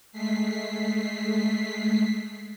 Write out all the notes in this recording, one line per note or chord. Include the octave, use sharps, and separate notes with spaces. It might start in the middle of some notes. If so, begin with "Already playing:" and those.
G#3 A3 B6 C7